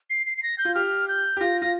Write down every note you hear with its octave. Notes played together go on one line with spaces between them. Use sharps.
C7
C7
C7
A#6
G6
F4
G4 F6
G6
G4
F4 A#6
F4 A#6